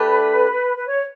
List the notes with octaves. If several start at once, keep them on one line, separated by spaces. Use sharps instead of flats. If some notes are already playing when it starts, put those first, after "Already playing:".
Already playing: A3 D4 G4 B4
B4
C#5